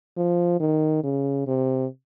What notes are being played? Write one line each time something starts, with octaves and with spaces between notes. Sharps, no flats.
F3
D#3
C#3
C3